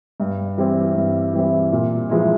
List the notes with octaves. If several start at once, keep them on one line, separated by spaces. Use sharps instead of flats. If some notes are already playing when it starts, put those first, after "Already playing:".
G2
E3 G3 C4 E4
G2
E3 G3 C4 E4
A#2
F3 G#3 E4